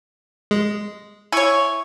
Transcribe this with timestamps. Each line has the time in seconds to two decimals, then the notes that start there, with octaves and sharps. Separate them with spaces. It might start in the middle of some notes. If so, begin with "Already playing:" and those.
0.51 G#3
1.32 E4 C#5 G#5 C#6 G#6